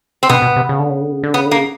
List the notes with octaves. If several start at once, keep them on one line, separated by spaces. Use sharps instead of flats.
C4
B2 B3
B2
C3
C#3
D3
C#3
D3
C#3
D3
C#3 B3
D3
A#3
C#3